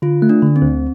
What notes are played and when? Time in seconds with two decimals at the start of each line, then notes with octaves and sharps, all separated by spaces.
0.02 D3 F4
0.22 A3
0.29 D4
0.42 D3
0.56 C4
0.62 D2